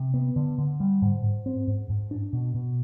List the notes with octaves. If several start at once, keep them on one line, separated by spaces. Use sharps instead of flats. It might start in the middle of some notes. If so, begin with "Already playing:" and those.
Already playing: C3
B3
D3
D3
G3
G#2
G#2
C4
G#2
G#2
D4
B2
B2